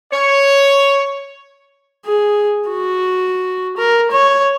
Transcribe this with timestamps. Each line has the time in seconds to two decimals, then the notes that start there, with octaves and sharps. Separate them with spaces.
0.12 C#5
2.06 G#4
2.69 F#4
3.77 A#4
4.11 C#5